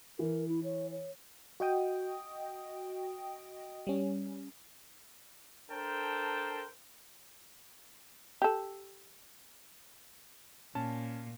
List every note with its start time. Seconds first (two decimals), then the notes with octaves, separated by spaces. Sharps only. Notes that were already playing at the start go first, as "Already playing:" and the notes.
0.19 E3 A#4
0.48 E4
0.64 C#5
0.91 C#5
1.60 F#4 D#5 G5 D#6
3.87 G3 C#4
5.71 D4 A4 A#4 C5 G5 A5
8.42 G4 A4
10.75 A#2 C#4 A5